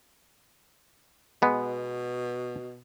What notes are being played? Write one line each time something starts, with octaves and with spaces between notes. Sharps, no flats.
B2 G#3 B3